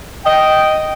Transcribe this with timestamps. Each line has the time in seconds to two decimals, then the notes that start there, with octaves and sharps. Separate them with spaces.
0.24 D#5 G5